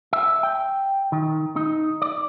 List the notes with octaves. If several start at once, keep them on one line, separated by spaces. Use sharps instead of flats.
E5
G5
D#3
D#4
D5